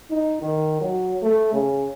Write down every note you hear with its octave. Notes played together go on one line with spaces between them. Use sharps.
D#4
D#3
F#3
A3
C#3